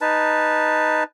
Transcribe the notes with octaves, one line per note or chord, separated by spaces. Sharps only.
D#4 B4 A5